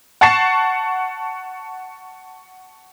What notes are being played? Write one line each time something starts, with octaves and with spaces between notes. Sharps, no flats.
F#5 A5 C#6 A6 C7 E7